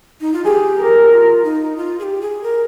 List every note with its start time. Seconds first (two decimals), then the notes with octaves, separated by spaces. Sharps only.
0.21 D#4
0.33 F4
0.45 G4 G#4
0.79 A#4
1.11 F4
1.44 D#4
1.77 F4
1.99 G#4
2.03 G4
2.22 G#4
2.43 A#4